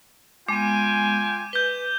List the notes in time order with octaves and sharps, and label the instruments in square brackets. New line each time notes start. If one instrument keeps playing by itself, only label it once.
[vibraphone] G#3 B3 [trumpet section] F4 G5 G#5 [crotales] D6 D#7
[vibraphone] B4 [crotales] G6 G7